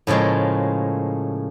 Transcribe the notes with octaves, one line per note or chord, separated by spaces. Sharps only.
A2 C#3 F3 G#3 A#3